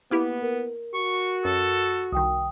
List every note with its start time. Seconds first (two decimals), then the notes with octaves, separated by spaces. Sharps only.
0.11 A#3 B3 E4 G4
0.42 A#4
0.94 F#4 C#6
1.45 F#2 A4
2.12 C2 D#3 G5 D#6